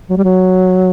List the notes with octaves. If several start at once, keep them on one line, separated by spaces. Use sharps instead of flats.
F#3
G3
F#3